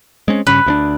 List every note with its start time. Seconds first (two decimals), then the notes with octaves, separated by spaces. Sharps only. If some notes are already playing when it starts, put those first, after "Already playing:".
0.28 G#3 C4 C#4
0.47 G2 C#3 C#4 B4
0.66 D2 B3 D4